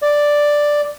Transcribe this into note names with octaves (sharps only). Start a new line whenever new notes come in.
D5